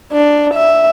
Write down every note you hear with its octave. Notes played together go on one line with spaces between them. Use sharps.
D4
E5